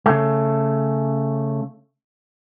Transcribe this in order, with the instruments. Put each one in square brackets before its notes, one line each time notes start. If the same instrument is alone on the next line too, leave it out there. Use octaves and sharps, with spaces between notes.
[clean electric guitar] C#3 A3